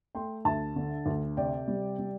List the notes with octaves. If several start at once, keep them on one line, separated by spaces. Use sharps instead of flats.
A3 G5 C6
D2 E5 A5
D3
D2
C3 D5 G5
G3
G3